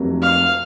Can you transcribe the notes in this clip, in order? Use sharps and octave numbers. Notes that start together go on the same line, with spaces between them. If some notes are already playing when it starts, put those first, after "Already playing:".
Already playing: F1 F2 C3 F#3 A#3
F5